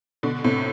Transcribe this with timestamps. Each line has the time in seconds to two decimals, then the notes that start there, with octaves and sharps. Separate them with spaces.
0.23 B2 D3
0.44 A2 C3